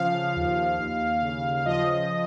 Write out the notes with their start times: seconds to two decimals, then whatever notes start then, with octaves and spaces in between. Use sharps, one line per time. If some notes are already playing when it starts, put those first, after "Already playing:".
Already playing: C#3 F3 F5
0.36 D#2
0.80 D#2
1.23 C#3
1.54 F5
1.66 F3 D#5